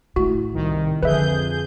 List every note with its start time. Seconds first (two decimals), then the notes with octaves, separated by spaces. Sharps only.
0.16 A2 F#4
0.54 C2 D#3
1.02 F2 D3 G#4 B4 E5 G6